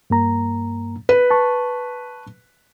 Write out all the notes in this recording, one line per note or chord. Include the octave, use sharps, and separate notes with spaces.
G2 A#3 A#5
B4
A5 C#6